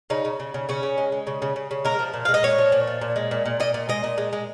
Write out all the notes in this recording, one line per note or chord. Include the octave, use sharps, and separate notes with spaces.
C#3 D#4
C#3
C#3
C#3
C#3 C#4
C#3
G#3
G#3
C#3
C#3
C#3
C#3
G#3 A#4
F3
A#2
G#3 F5
D#5
A#2 C#5
F3
A#2
F3
A#2
G#3
A#2
A#2
A#2 D#5
A#2
G#3 D#5
A#2
G#3
G#3